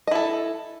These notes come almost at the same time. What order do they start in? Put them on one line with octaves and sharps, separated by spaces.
D#5 E4 A4